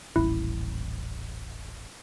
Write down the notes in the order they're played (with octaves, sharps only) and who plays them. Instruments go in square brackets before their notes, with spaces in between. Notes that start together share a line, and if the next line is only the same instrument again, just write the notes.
[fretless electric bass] D#1 A1 [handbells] E4